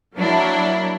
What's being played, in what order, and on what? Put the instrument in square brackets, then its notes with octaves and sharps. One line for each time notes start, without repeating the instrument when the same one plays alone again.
[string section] F#3 A#3 D4 E4